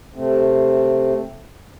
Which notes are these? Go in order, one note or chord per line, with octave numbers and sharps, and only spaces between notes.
C3 A3 C4